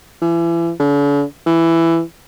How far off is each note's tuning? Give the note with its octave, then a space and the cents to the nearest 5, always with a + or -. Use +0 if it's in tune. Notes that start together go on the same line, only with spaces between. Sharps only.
E3 +35
D3 -45
E3 +10